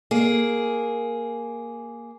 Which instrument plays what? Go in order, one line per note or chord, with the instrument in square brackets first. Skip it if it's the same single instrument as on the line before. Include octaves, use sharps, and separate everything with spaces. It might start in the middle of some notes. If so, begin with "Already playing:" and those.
[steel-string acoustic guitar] A#3 G#4